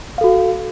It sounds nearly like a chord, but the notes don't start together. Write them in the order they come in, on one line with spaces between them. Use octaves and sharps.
F5 A4 F#4